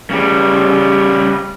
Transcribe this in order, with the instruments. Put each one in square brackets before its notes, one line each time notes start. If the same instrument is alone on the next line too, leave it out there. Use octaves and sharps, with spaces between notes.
[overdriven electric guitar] C#3 G3